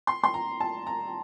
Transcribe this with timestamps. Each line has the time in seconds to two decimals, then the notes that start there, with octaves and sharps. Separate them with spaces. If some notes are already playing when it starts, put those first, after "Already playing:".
0.07 C6
0.24 C6
0.34 A#5
0.60 A5
0.87 A#5